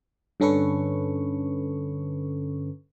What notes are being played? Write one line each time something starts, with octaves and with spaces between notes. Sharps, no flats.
G2 D3 C#4 A4 B4 C#6